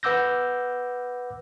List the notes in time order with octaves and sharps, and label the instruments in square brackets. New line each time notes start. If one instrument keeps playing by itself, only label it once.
[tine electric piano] B4 F#5 D6 E6 G6 A#6